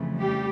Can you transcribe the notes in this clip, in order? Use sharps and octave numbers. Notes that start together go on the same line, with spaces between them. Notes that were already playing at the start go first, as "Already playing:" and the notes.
Already playing: F2 C#3 E3 A3
G3 G4